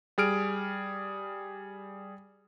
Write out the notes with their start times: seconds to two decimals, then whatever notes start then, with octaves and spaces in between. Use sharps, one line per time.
0.18 G3 G#4 F6 D7